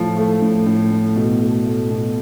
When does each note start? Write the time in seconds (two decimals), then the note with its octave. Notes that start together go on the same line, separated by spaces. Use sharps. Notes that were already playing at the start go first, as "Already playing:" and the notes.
Already playing: A2 F3
0.17 A3
0.42 A2
0.66 A2
0.91 A2
1.16 B2
1.40 A3
1.65 A3
1.90 B2